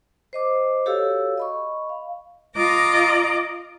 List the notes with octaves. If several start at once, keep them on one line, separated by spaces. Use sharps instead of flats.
C5 D#5 D6
F#4 G4 A4 C#5 F5 E6
D#5 B5 C#6
F5
F4 D#5 A#5 D6